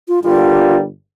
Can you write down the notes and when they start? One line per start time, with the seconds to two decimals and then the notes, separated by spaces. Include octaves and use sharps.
0.08 F4
0.23 G1 G2 D3 G3 A#3 F4